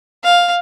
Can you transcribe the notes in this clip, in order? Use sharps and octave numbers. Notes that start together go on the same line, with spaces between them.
F5